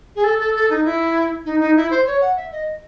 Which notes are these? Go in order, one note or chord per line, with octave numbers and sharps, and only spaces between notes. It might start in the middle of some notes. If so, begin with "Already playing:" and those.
G#4
A4
A4
A4
D#4
E4
D#4
D#4
E4
C5
C#5
F#5
E5
D#5